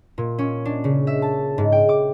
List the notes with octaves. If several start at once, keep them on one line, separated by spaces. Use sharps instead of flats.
A#2
C#4
D4
C#3
E5
A5
G#2
G5
D6